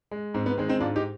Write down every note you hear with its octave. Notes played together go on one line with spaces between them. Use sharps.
G#3
G#2 C4
B3
D#3 G#3 C4
C4 D#4
G#2 D4 F4
D#4 G4